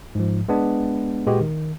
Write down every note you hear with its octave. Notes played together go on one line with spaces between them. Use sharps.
G#2 F3
G#3 B3 D4
A#2 G#3 F#4 G4 B4 D#5
D#3